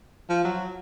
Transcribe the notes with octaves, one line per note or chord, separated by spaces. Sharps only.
F3
F#3